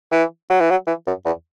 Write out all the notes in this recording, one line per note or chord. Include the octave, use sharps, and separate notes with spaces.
E3
F#3
E3
F#3
E3
F#2
E2